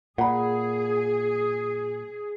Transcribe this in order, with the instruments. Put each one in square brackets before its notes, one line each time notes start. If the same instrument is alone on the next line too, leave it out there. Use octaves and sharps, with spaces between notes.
[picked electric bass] A#2 [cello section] G#4 [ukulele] F#5 B5